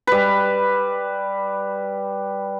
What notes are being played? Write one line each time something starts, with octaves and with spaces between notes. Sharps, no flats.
G3 B4